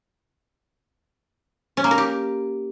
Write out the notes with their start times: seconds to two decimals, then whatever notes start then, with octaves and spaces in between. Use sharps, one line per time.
1.77 C#4
1.84 A#3
1.91 A#4
1.98 G4